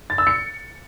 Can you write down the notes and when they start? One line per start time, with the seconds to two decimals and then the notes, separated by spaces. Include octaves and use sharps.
0.10 A6
0.18 E6
0.27 C#7